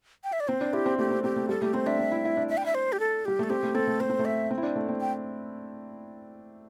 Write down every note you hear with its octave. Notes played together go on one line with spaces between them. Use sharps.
G5
E5
D5
C4 C5
D4
E4 G4
C4
A3 G4
C4
C4 G4
A3
G3 A4
A3 G4
C4 C5
D4 E5
C4
E4
E4
D4
E5
G5
E5
C5
G4
A4
G3 G4
A3 A4
C4 G4
A3
C4 A4
A3
A3 C5
C4
A3
E5
C4
E4
D4
A3
C4
G5